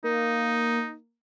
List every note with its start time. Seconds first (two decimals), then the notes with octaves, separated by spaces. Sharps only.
0.04 A#3 D#4